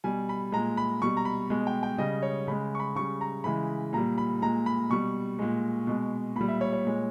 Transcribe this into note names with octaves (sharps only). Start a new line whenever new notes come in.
B2 G3 G#5
B5
A#2 G#3 A#5
B5
B2 G3 C#6
A#5
B5
B2 G#3
G5
G5
C#3 G3 D#5
C#5
C#3 G#3 B5
C#6
B5
C#3 G3 C#6
A#5
C#3 E3 G#3 B5
A#2 G3 A#5
B5
A#2 G#3 A#5
B5
B2 G3 C#6
A#2 G#3
B2 G#3
A#2 G3 B5
E5
C#5
C#5
A#2 G#3